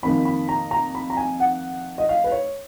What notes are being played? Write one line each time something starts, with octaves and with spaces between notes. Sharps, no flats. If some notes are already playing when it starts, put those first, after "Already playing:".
F2 D#3 A#3 B5
B5
A#5
A#5
B5
A#5
G#5
F#5
D#5
F5
B4
C#5